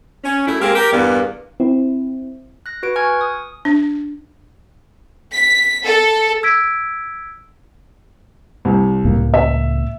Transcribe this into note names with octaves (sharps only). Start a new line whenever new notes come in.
C#4
F#2 A3 E4
G#3 A#3 C4 G4 A#4
G4 A#4
E2 G2 A#3 B3
C4 E4
F#6 A#6
F#4 B4 D7
G#5 C#6 F6 F#6 G#6
D#6
D4
B6
A4
E6 G#6 B6 D7
C2
C#2 A2 A#3
E5